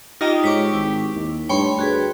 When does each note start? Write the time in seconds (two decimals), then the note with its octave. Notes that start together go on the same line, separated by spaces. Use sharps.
0.21 D#4 F4 G4 D#5 G5 A#5 D#6
0.43 G#2 C#5 C#6 D6 B6
0.73 G#1 E4
1.15 D#2
1.49 G2 A3 C#5 G5 B5 C6
1.79 D2 F#4 G#4 B4